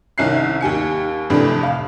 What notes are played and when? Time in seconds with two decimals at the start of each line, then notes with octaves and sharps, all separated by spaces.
0.18 C2 D#3 C#4 E5 F#6 C7
0.61 D#2 G4 G#5 C#7
1.30 F2 A2 C3 E3 D4
1.63 F5